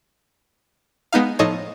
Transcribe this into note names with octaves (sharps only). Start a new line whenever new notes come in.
G#3 B3 D#4 F5
A2 F3 D#4 A4 C#5